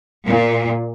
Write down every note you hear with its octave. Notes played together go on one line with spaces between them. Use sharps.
A#2